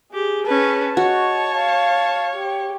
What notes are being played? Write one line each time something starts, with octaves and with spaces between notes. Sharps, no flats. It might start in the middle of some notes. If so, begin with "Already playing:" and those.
G4 G#4
C#4 B4 A5
F#4 C#5 D#5
F5 A5
G4